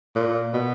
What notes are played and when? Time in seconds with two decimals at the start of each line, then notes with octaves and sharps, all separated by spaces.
0.15 A#2
0.53 B2